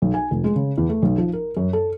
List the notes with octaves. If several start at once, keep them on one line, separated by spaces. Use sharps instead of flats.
B1
G#5
F1
G#3
C#3
E2
A3
B1
F3
A#4
F#2
A4